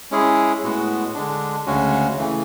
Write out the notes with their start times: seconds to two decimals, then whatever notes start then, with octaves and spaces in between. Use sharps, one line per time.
0.11 G#3 C#4 E4 G#4
0.63 A2 G#3 B3 F#4
1.14 D3 G#3 D4
1.66 D2 C#3 G#3 C#4 F#4
2.18 C#3 E3 A3